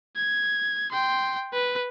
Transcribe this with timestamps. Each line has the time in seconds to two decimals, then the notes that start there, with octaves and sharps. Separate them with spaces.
0.17 G#6
0.91 G5 C6
1.53 B4